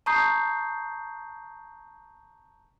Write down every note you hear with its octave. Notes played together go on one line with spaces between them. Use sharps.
A5 A#5 C#6 D#6 G6 C7